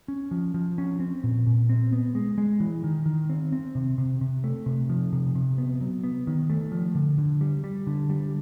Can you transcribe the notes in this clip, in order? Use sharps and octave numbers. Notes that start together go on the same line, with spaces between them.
C#4
F3
F3
C#4
C4
A#2
A#2
C4
B3
G#3
G#3
E3
D#3
D#3
C4
C4
C3
C3
C3
A3
C3
F3
C3
C3
B3
F#3
B3
D#3
A3
F3
D3
D3
G3
G3
D3
G3